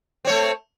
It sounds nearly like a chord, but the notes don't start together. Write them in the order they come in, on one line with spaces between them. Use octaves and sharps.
C4 C#5 A3